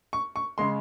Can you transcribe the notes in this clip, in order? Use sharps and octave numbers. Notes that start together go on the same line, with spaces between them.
C#6
C#6
C#3 G#3 C6